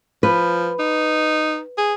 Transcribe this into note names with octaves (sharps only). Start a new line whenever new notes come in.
F3 B4
D#4
G#4